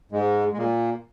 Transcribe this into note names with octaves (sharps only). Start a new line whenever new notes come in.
G#2 G#3
G#3
A#2 A#3